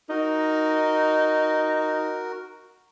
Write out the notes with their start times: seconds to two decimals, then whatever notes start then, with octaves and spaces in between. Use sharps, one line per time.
0.09 D#4 F#4 A#4